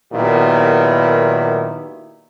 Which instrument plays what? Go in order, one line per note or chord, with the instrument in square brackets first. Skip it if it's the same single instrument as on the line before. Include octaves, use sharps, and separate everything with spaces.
[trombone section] A#2 D#3 F#3 B3 E4 G4